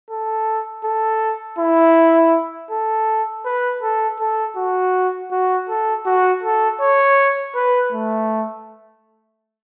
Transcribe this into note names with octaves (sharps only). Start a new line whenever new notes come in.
A4
A4
E4
A4
B4
A4
A4
F#4
F#4
A4
F#4
A4
C#5
B4
A3